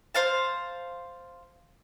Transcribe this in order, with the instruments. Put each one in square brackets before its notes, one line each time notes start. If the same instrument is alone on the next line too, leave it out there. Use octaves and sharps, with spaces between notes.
[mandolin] C5 F5 A5